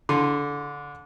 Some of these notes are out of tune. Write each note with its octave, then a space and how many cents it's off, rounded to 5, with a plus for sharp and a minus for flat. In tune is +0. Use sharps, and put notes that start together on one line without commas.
D3 -20 C6 +0